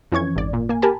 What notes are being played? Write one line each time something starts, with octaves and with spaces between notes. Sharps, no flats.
F2 E3 C#4 C#6 G#6
G#1 D5
A#2
A#3 G#5
G4 A#4 G#5 A5 B5